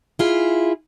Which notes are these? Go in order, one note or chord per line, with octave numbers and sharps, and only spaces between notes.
E4 F4 G#4